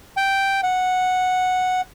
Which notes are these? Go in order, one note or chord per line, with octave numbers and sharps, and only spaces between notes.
G5
F#5